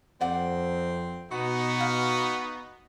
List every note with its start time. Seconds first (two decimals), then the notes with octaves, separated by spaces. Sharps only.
0.21 F2 C4 D5 F#5 D6
1.31 B2 B3 D#4 F#4
1.81 F5